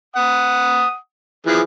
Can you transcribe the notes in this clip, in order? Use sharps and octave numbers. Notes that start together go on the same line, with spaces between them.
F#5 D#6
E3 F3 G#4